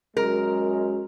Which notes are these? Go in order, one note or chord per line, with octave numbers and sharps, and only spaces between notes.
F#2 G#3 A#4